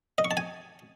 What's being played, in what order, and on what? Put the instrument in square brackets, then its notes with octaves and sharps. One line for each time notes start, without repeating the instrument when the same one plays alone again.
[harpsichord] D#5
C#6
A5
G#5